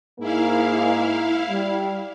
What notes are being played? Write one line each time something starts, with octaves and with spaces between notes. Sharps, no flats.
G#2 A#3 E4 F5
G3